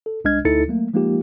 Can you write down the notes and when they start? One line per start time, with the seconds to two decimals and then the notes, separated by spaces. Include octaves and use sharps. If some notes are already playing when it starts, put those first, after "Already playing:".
0.06 A4
0.24 C2 G#3 D4 D#5 F6 G#6
0.45 D2 D#4 E4 A4 A6 C#7
0.68 F#3 A3 A#3
0.94 F3 G#3 A#3 D#4 F4 G4